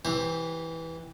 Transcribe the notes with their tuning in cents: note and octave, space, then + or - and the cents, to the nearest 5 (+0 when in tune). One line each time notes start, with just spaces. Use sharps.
E3 -10 G4 +0 C5 +15